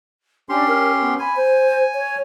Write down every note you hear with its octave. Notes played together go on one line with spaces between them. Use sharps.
C#4 D4 G4 C6
A#4
B3
G#5 B5
C5
C#5